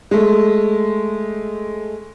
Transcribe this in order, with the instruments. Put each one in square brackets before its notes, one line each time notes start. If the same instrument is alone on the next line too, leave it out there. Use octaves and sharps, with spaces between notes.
[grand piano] G#3 A3